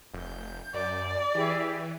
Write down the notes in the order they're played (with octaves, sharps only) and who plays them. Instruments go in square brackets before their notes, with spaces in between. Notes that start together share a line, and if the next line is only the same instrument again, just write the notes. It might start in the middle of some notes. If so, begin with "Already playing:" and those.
[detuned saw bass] F1 [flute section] G6
[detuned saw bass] F#2 [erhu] D5
[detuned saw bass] E3 [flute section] E4 G4 G#4